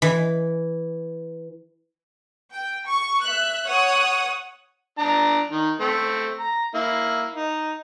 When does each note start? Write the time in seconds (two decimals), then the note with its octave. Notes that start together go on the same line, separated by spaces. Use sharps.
0.02 E3
2.53 G5
2.87 C#6
3.22 E5 F#6
3.66 C#5 F#5 D#6
4.98 D4 A#5
5.52 D#3
5.80 A3 C4
6.40 A#5
6.75 A#3 E4
7.35 D#4